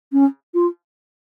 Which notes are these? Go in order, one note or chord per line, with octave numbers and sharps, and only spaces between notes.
C#4
F4